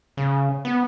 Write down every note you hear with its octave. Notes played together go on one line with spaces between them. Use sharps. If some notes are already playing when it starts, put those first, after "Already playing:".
C#3
B3